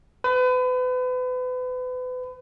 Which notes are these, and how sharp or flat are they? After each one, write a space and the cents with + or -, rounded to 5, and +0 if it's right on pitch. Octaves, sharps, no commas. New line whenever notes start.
B4 +35